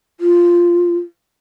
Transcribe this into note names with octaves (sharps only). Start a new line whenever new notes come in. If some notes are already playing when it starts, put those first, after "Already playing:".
F4